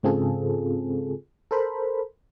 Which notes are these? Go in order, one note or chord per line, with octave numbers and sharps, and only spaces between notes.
G#2 C#3 C4 F4 G#4 A4
A4 A#4 C5 B5